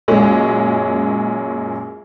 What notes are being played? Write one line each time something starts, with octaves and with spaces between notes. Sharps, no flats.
F#2 A#2 G#3 C#4